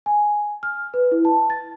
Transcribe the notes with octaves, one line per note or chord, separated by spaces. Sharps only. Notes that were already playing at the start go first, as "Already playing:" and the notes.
G#5
F6
B4
E4
A5
A6